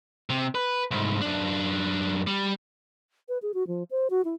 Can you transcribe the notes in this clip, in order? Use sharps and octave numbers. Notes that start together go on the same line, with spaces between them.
C3
B4
C2 G#2
F#2 D4
G3
B4
G#4
F#4
F3
C5
F#4
E4